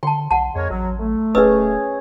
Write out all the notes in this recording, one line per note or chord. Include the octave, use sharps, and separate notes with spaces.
D3 G5 A5 C6
B1 F#5 A5
F2 G#3 A#4 C#5
A1 F#3
A3
D1 C#4 G#4 B4 D#5 E6